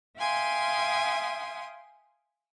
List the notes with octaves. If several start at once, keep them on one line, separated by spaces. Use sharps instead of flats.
E5 F5 G5 G#5 C6 D#6